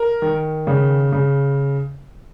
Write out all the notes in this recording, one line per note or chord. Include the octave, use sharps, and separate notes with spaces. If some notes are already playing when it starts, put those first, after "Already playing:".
Already playing: A#4
D#3
C#3
C#3